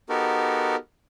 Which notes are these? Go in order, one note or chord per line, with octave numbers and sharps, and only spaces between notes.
B3 D#4 F#4 G4 A4 A#4